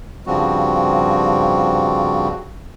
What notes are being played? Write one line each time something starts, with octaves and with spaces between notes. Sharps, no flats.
G2 C#3 F3 G3 C4 F#4